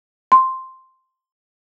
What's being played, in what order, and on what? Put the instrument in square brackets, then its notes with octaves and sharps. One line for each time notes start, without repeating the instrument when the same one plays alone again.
[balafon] C6